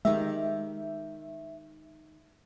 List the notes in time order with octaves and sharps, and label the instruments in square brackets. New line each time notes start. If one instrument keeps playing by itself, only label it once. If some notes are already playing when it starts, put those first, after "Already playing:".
[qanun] D#3 G4 A#5 [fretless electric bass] G#3 [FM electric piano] E5